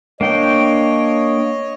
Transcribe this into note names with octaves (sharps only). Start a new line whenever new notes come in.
A#3 D4 C#5 D#5 G5